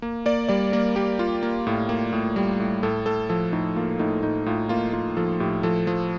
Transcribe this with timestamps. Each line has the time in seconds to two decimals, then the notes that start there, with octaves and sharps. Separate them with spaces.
0.02 A#3
0.26 A#3 D5
0.49 G3 D5
0.72 A#3 A#4
0.96 A#3 G4
1.19 A#3 F4
1.43 A#3
1.67 A2
1.89 A#3
2.13 A2
2.36 G3
2.60 A2
2.83 A2 A4
3.06 A2 A4
3.29 F3 A4
3.52 A2 D#4
3.76 A#3 F4
3.99 A2 D#4
4.23 A2 D#4
4.46 A2 F4
4.69 A#3 F4
4.93 A#3 F4
5.17 F3 A4
5.40 A2 G4
5.63 F3 A4
5.87 F3